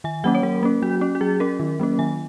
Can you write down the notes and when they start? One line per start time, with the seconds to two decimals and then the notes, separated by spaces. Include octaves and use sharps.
0.04 D#3 G#5
0.24 F#3 A#3 C#4 F#5
0.35 C#5
0.43 F#3 A#4
0.63 A#3 C#4
0.82 F#3 F#4
1.01 C#4
1.15 F#4
1.21 F#3 G#4
1.40 C#4 A#4
1.60 D#3
1.79 F#3 A#3 C#4
1.99 D#3 G#5